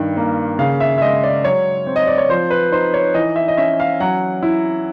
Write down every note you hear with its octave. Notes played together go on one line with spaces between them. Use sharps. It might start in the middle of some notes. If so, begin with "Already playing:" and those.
Already playing: G2 D#3
A#3
C#3 F5
E5
E5
G#3 D#5
D5
F#3 C#5
C4
D#5
D5
C#5
F3 C5
B4
D#4 C5
C#5
E3 D#5
E5
D#5
C#4 E5
F5
F#3 F#5
E4